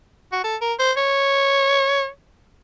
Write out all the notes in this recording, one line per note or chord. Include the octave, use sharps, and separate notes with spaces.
F#4
A4
A#4
C5
C#5